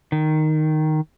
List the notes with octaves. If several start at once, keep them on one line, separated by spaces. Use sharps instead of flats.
D#3